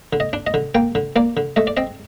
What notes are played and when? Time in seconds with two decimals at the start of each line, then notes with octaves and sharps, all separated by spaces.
0.13 D3
0.20 D#5
0.33 D4
0.47 D#5
0.54 D3
0.75 A#3 G5
0.95 D3
1.16 A#3 D5
1.37 D3
1.56 A3 D#5
1.67 D5
1.77 C4 D#5